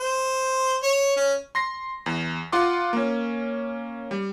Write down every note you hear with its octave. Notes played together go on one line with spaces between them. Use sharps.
C5
C#5
C#4
C6 A#6 C7
E2
F4 F#5 C6 D6
A#3 C#4
G3